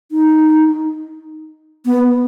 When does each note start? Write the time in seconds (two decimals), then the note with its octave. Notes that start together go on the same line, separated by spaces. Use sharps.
0.12 D#4
1.86 B3